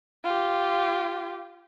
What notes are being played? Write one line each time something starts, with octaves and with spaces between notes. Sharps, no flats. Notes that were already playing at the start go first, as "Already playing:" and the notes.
F4 G4